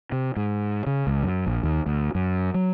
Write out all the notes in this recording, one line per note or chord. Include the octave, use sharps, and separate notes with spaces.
C3
G#2
C#3
C#2
F#2
A#1
D#2
D2
F#2
F#3